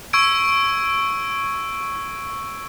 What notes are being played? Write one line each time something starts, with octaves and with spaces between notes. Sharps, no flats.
C#6 E6 G#6 D7